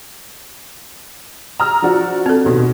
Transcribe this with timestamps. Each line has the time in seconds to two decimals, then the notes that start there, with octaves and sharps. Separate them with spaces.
1.60 A#5 E6 F6
1.82 F3 D4 F#4
2.26 C4 A4
2.45 D#2 B2